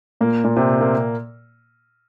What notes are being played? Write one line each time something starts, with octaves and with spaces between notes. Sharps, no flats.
A#2 A#3
A#2 A#3
C3 C4
A#2 A#3